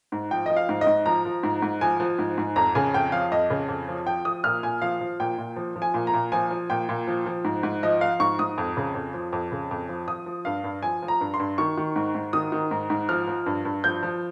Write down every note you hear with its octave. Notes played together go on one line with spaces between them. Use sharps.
G#2
F3 G5
F3 D#5
F5
G#2
D#5
G#2
F3 A#5
F3
G#2
G#2
F3 G#5
F3
G#2
G#2
F2 A#5
C#3 G#5
F2 G5
F3 F5
F2 D#5
C#3
F2
F3
F3 G5
F3 D#6
A#2 F6
A#2 G#5
F3 F5
F3
A#2 G5
A#2
F3
F3
G#5
A#2
A#5
A#2
F3 G#5
F3
A#2 G5
A#2
F3
F3
G#2
G#2
F3 D#5
F3 F5
G#2 C#6
G#2 D#6
F2
C#3
F2
F3
F2
C#3
F2
F3
F3 D#6
F3
G2 F5
G2
F3 G#5
F3
A#5
G2
C6
G2
D#3 C#6
D#3
G#2
G#2
D#3 D#6
D#3
G#2
G#2
F3 F6
F3
G2
G2
F3 G6
F3